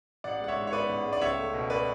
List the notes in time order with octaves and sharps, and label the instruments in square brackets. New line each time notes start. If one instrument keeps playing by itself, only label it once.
[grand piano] A1 D5 F#5
G#3 F#5
C#5 E5
G#2
C#5
B3 B4 D5
A1
G#3
D5
C#2 C#5 E5
A3
B2
B4 D5